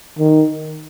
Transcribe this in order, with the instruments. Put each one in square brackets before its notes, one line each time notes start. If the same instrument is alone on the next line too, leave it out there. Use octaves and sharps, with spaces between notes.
[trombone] D#3